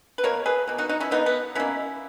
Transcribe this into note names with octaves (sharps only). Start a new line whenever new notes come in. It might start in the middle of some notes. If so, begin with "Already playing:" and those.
B4
B2 A#3 A#4 C#5
G#4 B4
B2 A#3
D#4 F#4
D#4 F#4
C#4 E4
B2 A#3 B3 D#4
B3
B2 A#3 C#4 E4